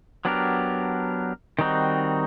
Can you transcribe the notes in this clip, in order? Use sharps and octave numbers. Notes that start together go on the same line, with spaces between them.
F#3 B3 D4 G4 A#4
D#3 G3 C4 D#4 F#4